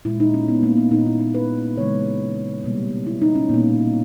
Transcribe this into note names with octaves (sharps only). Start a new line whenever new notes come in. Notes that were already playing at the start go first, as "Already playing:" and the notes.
A#2 G#3 E4
D#4
C#4
B3
A#3
B3
A#2 A#3 D#4
E4
D#4
B4
C#3 E3 G#3 C#5
B2 G3 A#3
E4
D#4
C#4
A#2 A#3 B3